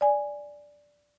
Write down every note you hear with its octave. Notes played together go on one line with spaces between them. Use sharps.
D5 G#5